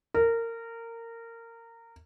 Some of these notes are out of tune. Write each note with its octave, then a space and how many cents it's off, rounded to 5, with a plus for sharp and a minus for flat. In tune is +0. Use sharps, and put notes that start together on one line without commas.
A#4 -20